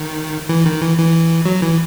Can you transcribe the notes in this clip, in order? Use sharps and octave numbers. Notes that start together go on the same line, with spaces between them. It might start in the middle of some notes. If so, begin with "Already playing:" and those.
Already playing: D#3
E3
D#3
E3
E3
F#3
E3